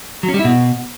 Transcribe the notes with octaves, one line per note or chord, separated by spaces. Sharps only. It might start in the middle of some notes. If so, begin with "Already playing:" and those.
F#3
C#4
G3
E4
B2